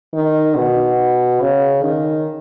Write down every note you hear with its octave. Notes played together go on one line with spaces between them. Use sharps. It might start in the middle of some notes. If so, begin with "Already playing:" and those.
D#3
B2
C#3
D#3